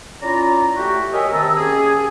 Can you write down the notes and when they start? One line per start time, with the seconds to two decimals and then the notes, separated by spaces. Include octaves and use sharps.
0.22 C#4 E4 F4 D5 A#5
0.76 A3 F#4 G4
1.13 G4 A#4 C#5 D#5 E5 G#5
1.32 C3 D#3 A5 A#5 E6
1.56 A#3 C#4 G4 G#4